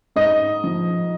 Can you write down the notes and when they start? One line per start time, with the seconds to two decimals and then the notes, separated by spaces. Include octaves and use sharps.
0.16 G#2 D#5
0.64 F3